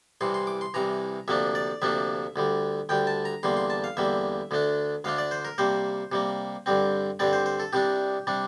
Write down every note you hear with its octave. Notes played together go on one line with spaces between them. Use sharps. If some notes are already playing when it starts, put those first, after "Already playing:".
C2 C3 E3 C6
C6
D6
C6
C2 C3 E3 A#5
D2 C3 F3 A#3 D4 E5
D5
D2 C3 F3 A#3 D4 E5
D2 D3 G3
D2 D3 G3 G5
A5
A#5
E2 D3 G3 A#3 C6
C6
A5
F5
E2 D3 G3 A#3 E5
D2 D3 A3 D4
D2 D3 A3 D4 F5
D5
C5
A#4
C3 G3 A#3 C5
C3 G3 A#3
G2 D3 G3 C4
G2 D3 G3 C4 D5
C5
C5
A4
C2 C3 G3 D4 G4
C3 G3 D4